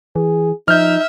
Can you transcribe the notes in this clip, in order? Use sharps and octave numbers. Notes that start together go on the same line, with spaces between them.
E3 G#4
F3 D#4 E5 F6 G6